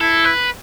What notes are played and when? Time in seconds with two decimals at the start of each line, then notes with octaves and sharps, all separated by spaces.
0.01 E4 A4
0.25 B4